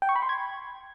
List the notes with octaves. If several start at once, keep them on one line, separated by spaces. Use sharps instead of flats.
G5
C#6
B5
C6
G#6